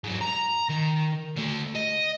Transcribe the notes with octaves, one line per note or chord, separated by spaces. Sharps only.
G#2 F#3
A#5
D#3
D3 A3
D#5